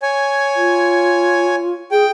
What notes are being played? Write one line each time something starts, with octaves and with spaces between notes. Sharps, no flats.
C#5 G#5
F4
G#4 G5